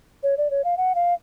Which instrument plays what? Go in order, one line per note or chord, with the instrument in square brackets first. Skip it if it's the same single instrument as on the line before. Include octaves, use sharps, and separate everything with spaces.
[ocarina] C#5
D5
C#5
F5
F#5
F5